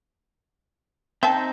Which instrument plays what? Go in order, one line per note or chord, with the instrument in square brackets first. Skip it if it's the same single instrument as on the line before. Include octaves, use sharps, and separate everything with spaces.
[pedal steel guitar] C4 D#4 [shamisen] E5 G5 A5